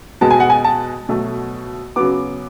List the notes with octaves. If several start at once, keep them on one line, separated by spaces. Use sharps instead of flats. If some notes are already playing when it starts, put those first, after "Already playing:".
B2 G#3 B3 A5
G#5
F#5
G#5
A5
B2 F#3 A3
C#3 F#3 B3 D6